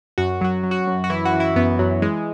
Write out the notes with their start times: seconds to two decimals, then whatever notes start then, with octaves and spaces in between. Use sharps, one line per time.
0.18 F#2 F#4
0.41 F#3 F#4
0.63 F#3
0.71 F#4
0.87 F#2
1.04 F#4
1.10 E3 E4
1.25 F#4
1.33 E3
1.40 E4
1.56 F#2 B3
1.79 F#2 F#3
2.02 E3 G#3